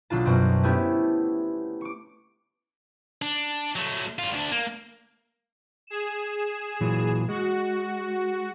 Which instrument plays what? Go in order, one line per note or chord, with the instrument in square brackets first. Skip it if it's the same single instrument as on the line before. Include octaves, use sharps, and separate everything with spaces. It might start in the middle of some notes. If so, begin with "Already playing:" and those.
[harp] B1 D4 F4 A5
F#2 B2 C4
A3 B3 C#4 E4 G4
C#6 D6
[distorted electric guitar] D4
F#3 A3
G2 F4
D2 D4
A#3
[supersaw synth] G#4 E7
[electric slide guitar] A#2 E3 F#3
[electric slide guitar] G#3 [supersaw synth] F#4